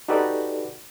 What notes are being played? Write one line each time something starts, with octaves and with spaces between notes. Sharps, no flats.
D#4 F#4 G4 A4 B4 D5